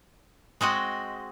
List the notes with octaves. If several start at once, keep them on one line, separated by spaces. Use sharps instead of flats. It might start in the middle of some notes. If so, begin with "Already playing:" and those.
G#3 C4 F#4 D#5